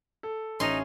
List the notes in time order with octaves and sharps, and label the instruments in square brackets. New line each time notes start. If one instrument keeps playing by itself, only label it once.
[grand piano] A4
[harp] A1 [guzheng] C#4 C6 [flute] D#4